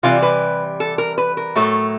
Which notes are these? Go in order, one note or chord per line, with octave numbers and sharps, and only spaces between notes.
C3 E3 G3 F4
B4
A4
A#4
B4
A#4
A2 F#3 A3